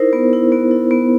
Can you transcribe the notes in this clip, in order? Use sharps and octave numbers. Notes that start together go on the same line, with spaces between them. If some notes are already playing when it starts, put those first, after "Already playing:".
Already playing: D#4 E4 A#4 C5
B3
E4
B3
E4
B3